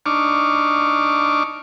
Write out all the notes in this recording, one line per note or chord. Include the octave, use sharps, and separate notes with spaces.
D4 D#4 C#6 D6 F6